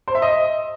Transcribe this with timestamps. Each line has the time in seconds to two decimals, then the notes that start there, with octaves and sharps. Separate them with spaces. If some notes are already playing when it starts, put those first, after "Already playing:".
0.08 C5
0.15 E5
0.22 D#5